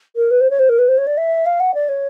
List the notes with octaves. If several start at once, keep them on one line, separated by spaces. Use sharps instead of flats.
A#4
B4
C5
C#5
C5
A#4
B4
C5
C#5
D5
E5
F5
F#5
D5
C#5